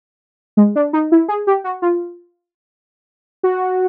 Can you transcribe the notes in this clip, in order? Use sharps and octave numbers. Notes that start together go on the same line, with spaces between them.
G#3
D4
D#4
E4
G#4
G4
F#4
F4
F#4